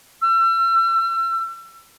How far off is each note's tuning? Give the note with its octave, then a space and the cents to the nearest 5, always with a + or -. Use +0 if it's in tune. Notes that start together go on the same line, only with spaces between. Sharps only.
E6 +40